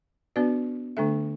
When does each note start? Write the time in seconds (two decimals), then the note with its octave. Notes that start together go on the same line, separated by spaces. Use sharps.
0.36 B3 D4 F#4 B4 D5
0.97 D3 A3 D4 A4 E5